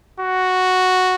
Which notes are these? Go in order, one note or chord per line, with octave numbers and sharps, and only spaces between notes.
F#4